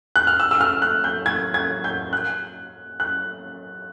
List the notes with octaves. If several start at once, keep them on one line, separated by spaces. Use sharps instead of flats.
F#6
F6
E6
E6
F6
F#6
G6
G#6
G#6
G6
F#6
F#6